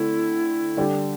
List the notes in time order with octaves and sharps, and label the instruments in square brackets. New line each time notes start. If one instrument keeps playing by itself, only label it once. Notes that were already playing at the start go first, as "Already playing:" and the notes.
Already playing: [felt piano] D3 A3 C4 [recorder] E4
[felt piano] D3 G3 D4 G4